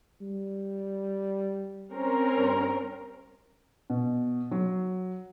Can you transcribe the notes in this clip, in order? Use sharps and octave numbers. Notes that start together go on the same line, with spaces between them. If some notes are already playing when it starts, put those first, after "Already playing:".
G3
C4 C#4 A#4
G2
B2
F#3